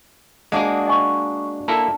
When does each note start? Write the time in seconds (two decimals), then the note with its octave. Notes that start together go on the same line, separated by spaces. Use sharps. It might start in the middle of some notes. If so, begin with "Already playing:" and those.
0.52 G#3 A#3 D4 F#4 G#4
0.87 D#5 G#5 C#6
1.68 A#3 E4 A4 A5